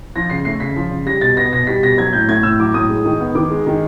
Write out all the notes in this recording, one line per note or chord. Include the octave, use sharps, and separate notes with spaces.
F3 A#6
C#3 C7
A3 C7
C#3 B6
F3
C#3
G3 A#6
B2 A6
B3 A#6
B2 A#6
G3 B6
B2 A#6
F#3 G#6
A2 G6
A3 G#6
A2 E6
F#3 D6
A2 D#6
G#3
D#3
B3
D#3 D6
G#3
D#3